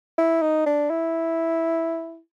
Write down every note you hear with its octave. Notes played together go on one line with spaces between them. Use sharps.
E4
D#4
D4
E4